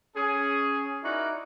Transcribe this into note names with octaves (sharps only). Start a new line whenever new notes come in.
C#4 G#4
D#4 E4 F#4 A#4 D5